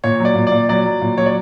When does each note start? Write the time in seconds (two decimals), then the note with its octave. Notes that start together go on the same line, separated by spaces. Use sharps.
0.04 A#2 C#5
0.20 F#3
0.25 D5
0.35 A#2
0.47 D5
0.52 A#2
0.69 F#3 D5
0.86 F#3
1.01 A#2
1.18 F#3 C#5
1.26 D5